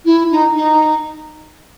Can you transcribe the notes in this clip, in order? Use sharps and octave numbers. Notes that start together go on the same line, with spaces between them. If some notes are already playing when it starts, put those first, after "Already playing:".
E4
D#4
D#4